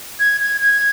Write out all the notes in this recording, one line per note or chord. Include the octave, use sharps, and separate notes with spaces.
G#6
G#6
G#6